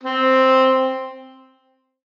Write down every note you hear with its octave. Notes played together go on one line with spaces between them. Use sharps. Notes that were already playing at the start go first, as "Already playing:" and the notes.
C4